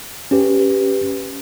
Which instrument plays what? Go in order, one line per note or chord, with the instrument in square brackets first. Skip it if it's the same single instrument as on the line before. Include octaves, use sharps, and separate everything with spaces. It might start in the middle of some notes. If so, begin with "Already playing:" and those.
[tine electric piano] C#4 G4 B4